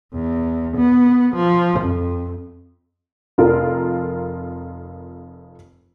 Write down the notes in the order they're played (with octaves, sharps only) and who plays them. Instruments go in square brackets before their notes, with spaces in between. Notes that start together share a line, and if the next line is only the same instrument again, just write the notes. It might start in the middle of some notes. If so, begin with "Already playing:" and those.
[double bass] E2
B3
F3
F2
[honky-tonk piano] F1 F2 F4 A#4